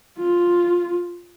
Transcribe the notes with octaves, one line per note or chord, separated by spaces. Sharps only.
F4